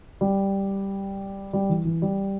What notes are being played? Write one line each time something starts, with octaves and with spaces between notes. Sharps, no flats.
G3
G3
E3
E3
G3